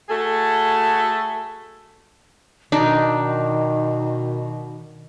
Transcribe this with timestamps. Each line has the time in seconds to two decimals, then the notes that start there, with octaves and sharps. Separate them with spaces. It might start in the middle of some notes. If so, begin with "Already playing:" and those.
0.09 A3 F#4 G#4 A4
2.72 B2 D#3 D4 D#4